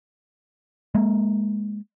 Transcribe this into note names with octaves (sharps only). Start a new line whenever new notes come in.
G#3 A#3